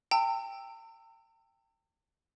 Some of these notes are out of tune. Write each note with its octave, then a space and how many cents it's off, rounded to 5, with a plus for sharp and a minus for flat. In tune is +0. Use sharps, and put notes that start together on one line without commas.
G5 +10 A#5 -45 E6 +0